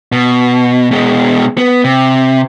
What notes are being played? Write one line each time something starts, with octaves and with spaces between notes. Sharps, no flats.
B2
B2 G#3
B3
C3